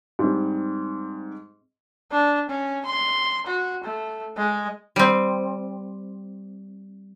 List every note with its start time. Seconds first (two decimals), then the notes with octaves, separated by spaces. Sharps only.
0.19 G#2 G3 C4
2.11 D4
2.49 C#4
2.86 C6
3.47 F#4
3.84 A3
4.37 G#3
4.96 G3 C4